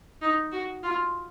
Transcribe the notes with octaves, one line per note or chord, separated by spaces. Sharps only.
D#4
F#4
F4